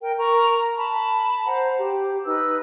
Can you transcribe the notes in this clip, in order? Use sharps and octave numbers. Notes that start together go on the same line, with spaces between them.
A#4 G5
A#4 A#5 C#6
A5 B5
C5 F#5 A#5
G4
D#4 B4 E6